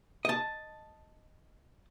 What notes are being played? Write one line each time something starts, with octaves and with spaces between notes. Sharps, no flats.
D#5 A5